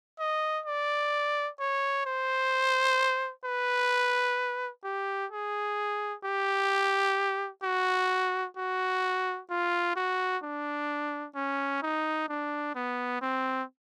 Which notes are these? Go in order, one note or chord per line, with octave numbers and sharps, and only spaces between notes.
D#5
D5
C#5
C5
B4
G4
G#4
G4
F#4
F#4
F4
F#4
D4
C#4
D#4
D4
B3
C4